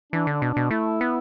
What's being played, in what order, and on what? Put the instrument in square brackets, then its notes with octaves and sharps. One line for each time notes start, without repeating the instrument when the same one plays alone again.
[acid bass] E3 [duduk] D4
[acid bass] D3
[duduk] D4
[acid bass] B2
[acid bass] B2 [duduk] D4
[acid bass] A3 [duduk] E4
[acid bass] B3